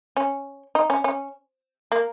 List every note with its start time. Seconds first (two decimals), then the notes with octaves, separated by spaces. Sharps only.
0.17 C#4
0.75 D#4
0.90 C#4
1.04 C#4
1.92 A#3